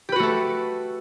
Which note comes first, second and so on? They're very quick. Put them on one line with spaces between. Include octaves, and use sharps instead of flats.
G4 B4 F#4 A3 A4